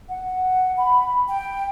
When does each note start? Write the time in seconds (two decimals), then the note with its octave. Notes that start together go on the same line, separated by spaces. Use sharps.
0.09 F#5
0.77 B5
1.29 G5